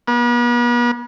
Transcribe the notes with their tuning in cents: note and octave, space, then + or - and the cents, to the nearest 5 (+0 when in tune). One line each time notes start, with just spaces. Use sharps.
B3 -45